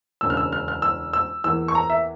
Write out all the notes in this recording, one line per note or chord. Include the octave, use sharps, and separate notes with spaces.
E1 D2 C#3 E6
F6
E6
F6
F6
E6
E6
E2 E3 A#3 E6
C#6
A#5
E5